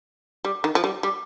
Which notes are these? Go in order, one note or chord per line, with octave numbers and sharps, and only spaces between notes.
G3
D#3
F3
G3
G3